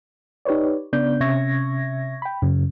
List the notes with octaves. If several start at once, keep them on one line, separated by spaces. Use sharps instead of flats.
D#4 G4 B4 C#5 D5
C#3 B3 D4 D5 G6
C3 C#4 E5 C#6 G#6 A#6
G5 B5
F#2 C#3